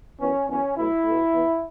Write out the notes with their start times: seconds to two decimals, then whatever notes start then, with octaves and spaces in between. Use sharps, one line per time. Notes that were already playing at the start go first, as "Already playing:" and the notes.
0.20 F#2 E3 B3 C#4
0.49 F#2 E3 B3 C#4
0.77 B2 F#3 A3 E4
1.05 B2 A3
1.33 E2 E3 B3